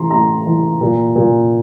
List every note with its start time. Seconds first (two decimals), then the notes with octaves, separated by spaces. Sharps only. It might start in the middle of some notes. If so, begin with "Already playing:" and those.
Already playing: A2 E3 A#5 C6
0.11 A2 A#5
0.46 E3
0.81 A#2
1.16 A#2